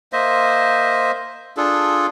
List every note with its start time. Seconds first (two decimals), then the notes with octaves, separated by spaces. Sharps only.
0.13 A#3 C5 D#5 E5
1.57 D4 F4 G#4 A4